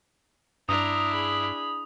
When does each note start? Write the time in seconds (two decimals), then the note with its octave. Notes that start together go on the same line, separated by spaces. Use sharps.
0.69 G2 D4 E4 A#5 D#6
1.12 G#4 B5